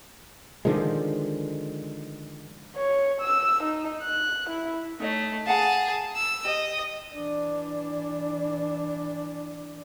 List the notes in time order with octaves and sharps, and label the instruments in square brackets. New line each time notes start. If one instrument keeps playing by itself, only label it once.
[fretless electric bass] D3 D#3 F3 G#3
[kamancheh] C#5
E6
D#4
F#6
E4
[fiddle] A3 [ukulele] D#4 C#5 D#5
[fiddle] G#4 A5 [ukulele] F5 F#5 A#5
[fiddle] E6
[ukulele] G4 [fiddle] D#5
[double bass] E3 D4